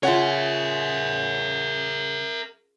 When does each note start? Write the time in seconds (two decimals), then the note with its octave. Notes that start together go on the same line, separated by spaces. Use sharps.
0.03 C#3 F4 A#4 C#5 E5 F#5